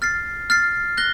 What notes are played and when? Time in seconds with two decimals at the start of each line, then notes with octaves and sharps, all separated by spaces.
0.02 F6 A6 C7
0.50 F6 A6 C7
0.98 F#6 A#6 G7